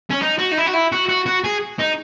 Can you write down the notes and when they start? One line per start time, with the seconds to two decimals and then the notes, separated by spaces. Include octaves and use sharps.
0.10 C#4
0.22 D#4
0.38 F#4
0.52 D#4
0.57 E4
0.66 F#4
0.73 E4
0.92 F#4
1.09 F#4
1.26 F#4
1.44 G#4
1.79 D#4